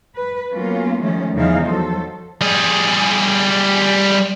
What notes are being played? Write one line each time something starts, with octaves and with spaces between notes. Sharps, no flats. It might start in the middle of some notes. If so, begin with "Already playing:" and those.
B4
F#3 A#3 B3 C#4 F4
D#3 F3 G3 A3 C#4
E2 C#3 F3 D#4 E4 F5
F3 F#3 A4 C5
G3 G#4